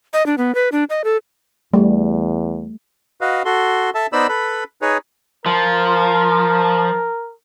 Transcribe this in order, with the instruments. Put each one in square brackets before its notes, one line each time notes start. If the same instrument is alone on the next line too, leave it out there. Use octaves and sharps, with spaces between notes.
[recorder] D#5
D4
B3
B4
D4
D#5
A4
[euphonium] E2 [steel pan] G3 [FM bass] A3
[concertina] F#4 B4 D#5 F5
F#4 A4 C6
A4 E5 A5
B3 D#4 C5 D5 B5 E6
A4 B4 B5
D#4 G#4 B4 C#5
[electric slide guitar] F3 [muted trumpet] A#4